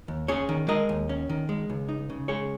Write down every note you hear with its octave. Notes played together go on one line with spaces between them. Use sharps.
D#2
C#4 G#4 C#5
D#3
G#3 A#4 D#5
D#2
C#4
D#3
G#3
C#2
D#4
C#3
G#3 G#4 C#5